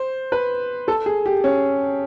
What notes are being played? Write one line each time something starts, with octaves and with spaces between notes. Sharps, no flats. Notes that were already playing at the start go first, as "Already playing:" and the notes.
Already playing: C5
B4
A4
G#4
G4
C#4